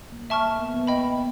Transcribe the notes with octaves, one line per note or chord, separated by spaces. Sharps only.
A#3
A#3 E5 A5 C#6 F6
A#3
B3
B3
D#5 G5 B5